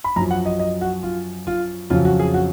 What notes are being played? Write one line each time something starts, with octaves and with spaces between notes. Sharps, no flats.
B5
F#2 F3 A#5
F#5
D#5
D#5
F#4
F4
F4
F2 C#3 F#3 F4
F#4
G#4
F#4